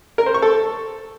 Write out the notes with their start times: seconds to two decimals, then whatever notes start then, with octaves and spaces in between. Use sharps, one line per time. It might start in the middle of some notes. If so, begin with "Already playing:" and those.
0.18 A#4
0.26 C5
0.34 C#6
0.42 A4